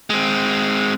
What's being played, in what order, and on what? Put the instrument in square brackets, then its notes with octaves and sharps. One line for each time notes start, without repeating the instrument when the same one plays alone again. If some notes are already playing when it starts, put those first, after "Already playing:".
[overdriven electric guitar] G#3 C4